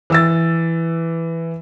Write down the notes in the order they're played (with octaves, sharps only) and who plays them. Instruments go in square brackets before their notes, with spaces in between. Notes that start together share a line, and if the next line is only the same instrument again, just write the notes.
[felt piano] E3 E6 A6